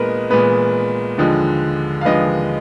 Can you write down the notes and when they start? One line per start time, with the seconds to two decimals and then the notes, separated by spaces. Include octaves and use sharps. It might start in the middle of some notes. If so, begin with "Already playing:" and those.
Already playing: A#2 G#3 B3 A#4 B4 D#5
0.30 A#2 G#3 B3 B4
1.18 D#2 D3 F3 G#3
2.01 F5
2.05 D#2 D3 F3 G#3 B4 D#5